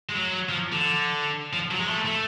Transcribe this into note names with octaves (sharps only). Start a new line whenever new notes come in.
G#3
F#3
F3
D3
F3
F#3
G#3
A3
A3